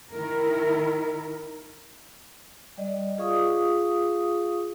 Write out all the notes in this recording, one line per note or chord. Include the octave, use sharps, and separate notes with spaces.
D#3 E4 A#4
G3 D5 D#5
F4 G#4 F5 C#6 D#6